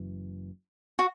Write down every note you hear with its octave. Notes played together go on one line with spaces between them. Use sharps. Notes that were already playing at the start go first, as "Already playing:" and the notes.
Already playing: F#1 F#2 E3
F#4